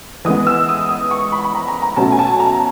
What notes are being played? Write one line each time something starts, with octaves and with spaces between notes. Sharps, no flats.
E3 G#3 B3 D#6
E6
D#6
D#6
C#6
B5
B5
A#5
A#5
A#5
B2 F#3 A3 C#4 A5
G#5
A5
A#5